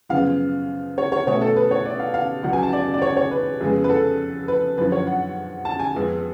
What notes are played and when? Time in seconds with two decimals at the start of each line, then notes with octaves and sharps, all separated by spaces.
0.09 F#2 C#3 F3 B3 F5
0.98 C#5
1.12 C#5
1.27 B2 A3 C#4 C#5
1.41 A4
1.56 B4
1.71 C#5
1.86 D5
1.99 F5
2.14 F5
2.43 C#2 C#3 F#3 B3 F#5
2.53 G#5
2.63 A5
2.73 D5
2.94 D5
3.02 C#5
3.17 C#5
3.31 B4
3.61 F2 C#3 G#3 B3
3.84 B4
3.90 A4
4.48 B4
4.77 F#2 D3 F3 B4
4.92 C#5
5.07 F#5
5.65 A5
5.79 G#5
5.95 F2 F3 G#3 B3